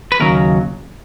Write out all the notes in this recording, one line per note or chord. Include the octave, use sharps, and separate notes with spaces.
B4
D#2 C#3 F#3 A#4